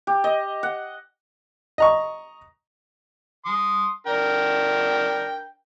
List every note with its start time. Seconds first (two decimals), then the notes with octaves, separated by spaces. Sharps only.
0.07 G4
0.24 D#5
0.63 F#5
1.78 D#5 A#5 C#6
3.46 C6 D#6
4.07 D4 A#4 G5